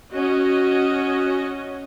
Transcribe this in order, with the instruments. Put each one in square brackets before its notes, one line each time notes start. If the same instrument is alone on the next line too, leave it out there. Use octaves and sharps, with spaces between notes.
[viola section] C#4 F#4 D#5